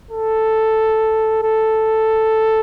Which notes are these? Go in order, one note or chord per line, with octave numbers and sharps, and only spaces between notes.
A4
A4